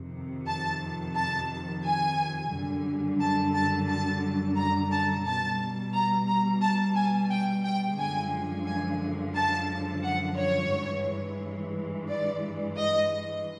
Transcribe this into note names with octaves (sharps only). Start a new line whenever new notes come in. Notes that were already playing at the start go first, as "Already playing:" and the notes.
Already playing: F2 C3 D#3
A5
A5
G#5
F#2 D3 G3
A5
A5
A5
A#5
A5
B2 G3 A5
A#5
A#5
A5
G#5
G5
G5
F#2 D3 F3 G#3 G#5
G#5
A5
F#5
C#5
G2 E3 G#3
D5
D#5